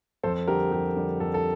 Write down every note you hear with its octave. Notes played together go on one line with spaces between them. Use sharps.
F2 A4 C5
D3 G3 G4 A#4
F2 G4
D3 G3
F2 A4
A4